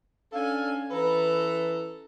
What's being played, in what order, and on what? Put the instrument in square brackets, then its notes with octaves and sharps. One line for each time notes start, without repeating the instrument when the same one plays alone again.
[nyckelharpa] C#4 G#5 [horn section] D4 A4 F5
[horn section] E3 B4 [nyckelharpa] A4 A#5